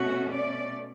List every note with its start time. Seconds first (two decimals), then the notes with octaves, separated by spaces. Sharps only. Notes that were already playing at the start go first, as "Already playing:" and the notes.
Already playing: B2 A3 C#4 F#4
0.31 D5